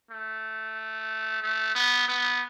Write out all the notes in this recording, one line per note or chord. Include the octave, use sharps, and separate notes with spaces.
A3
A3
B3
B3